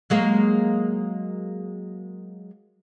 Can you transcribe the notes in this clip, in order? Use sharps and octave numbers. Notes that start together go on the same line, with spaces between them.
F#3 G#3 A#3